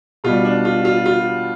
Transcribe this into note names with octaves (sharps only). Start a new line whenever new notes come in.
B2 G3 F4
D4
F4
F4
F4